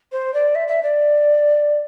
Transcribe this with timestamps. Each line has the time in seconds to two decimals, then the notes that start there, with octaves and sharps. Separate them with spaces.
0.12 C5
0.34 D5
0.55 E5
0.68 E5
0.83 D5